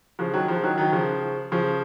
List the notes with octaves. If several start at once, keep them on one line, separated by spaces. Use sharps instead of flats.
C#3 F3
D#3 F#3
C#3 F3
D#3 F#3
D#3 F#3
C#3 F3
C#3 F3